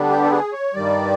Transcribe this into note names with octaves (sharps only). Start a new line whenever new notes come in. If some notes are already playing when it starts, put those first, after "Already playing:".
Already playing: D3 G3 B3 D4
G4
A4
G#4
C#5
G2 D#3 G3 D5